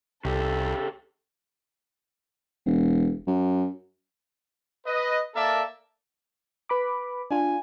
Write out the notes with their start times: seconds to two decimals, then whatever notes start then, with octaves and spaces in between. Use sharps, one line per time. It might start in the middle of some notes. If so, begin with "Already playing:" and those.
0.25 C2 C#3 G4 A4
2.66 E1
3.27 F#2
4.86 B4 D#5
5.35 A#3 A4 A#4 D5 E5 A5
6.69 B4 B5 D6
7.31 D4 F4 G#5